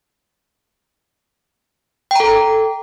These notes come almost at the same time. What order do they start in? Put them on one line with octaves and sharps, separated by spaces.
G5 A#5 A4